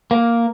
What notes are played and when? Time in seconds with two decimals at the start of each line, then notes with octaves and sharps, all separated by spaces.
0.11 A#3